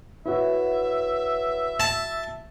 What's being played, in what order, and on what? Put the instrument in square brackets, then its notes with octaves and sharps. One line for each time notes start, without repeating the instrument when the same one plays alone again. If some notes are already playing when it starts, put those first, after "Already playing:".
[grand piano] E4 F#4 [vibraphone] B4 C#5 F#5 [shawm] E5
[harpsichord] A5